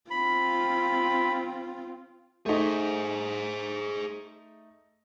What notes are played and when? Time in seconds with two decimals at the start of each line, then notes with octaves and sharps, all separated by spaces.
0.11 C4 F4 B5
2.46 A3 D#4 G#4 C5